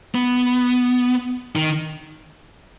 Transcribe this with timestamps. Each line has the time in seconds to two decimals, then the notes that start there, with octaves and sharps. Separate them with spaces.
0.15 B3
1.56 D#3